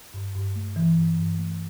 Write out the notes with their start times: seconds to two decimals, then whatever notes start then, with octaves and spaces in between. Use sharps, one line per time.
0.14 G2
0.35 G2
0.56 A3
0.76 E3
0.97 G2
1.18 G2
1.38 A3